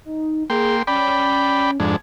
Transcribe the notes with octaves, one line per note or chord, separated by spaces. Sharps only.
D#4
A#3 G#4 G5 C6
C#4 D5 G5 B5
F2 G#2 D4 G#6